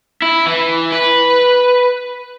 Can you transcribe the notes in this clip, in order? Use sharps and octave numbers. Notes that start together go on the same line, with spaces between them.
E4
E3
B4